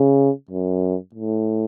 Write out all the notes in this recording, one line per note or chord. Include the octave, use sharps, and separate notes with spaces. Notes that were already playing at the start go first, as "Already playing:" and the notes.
Already playing: C#3
F#2
A2